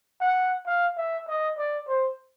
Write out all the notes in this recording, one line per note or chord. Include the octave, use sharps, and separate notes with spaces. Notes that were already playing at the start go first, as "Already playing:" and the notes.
F#5
F5
E5
D#5
D5
C5